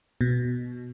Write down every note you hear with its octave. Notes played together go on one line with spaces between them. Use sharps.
B2